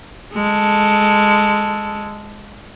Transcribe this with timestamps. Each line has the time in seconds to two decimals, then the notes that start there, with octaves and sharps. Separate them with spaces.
0.34 G#3 A4